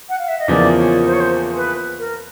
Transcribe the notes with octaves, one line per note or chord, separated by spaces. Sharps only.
F#5
F5
E5
D#5
E2 C#3 F3 A#3 D5
C#5
C5
C#5
C5
B4
A#4